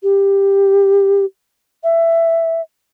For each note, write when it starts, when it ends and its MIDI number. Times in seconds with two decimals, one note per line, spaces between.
0.03 1.25 67
1.84 2.61 76